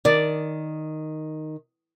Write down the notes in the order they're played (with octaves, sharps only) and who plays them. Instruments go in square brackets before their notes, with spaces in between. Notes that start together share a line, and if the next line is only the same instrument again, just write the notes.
[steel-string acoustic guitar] D#3 [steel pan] D5